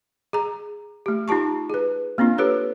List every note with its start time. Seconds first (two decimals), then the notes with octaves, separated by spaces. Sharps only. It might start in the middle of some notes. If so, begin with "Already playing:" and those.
0.33 G#4 A#5
1.06 A3 G4
1.28 D#4 F4 G4 A5 C#6
1.70 G#4 B4
2.18 A#3 C4 D4 F4
2.38 G4 A4 B4 C#5